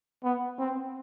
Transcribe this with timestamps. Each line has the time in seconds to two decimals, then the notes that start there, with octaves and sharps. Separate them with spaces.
0.24 B3
0.59 C4